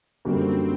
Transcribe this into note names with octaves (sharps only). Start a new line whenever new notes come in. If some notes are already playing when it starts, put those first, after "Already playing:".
F#2 D3 G3 A#3 C4 F#4